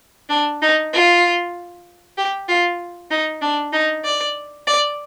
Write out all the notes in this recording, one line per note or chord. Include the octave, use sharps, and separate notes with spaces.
D4
D#4
F4
G4
F4
D#4
D4
D#4
D5
D5